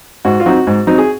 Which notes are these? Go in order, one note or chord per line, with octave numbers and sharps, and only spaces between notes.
G#2 F#4
F4
F#3 C4 D#4 F#4
G#2
F#3 C4 D#4
G#4